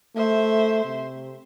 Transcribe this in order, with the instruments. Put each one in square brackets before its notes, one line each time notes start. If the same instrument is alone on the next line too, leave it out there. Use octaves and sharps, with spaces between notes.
[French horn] A3 [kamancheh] C5 E5
[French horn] C3